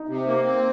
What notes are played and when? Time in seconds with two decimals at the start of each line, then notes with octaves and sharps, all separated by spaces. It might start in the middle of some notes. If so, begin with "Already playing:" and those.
Already playing: D#4
0.08 C3
0.27 A#3
0.45 C4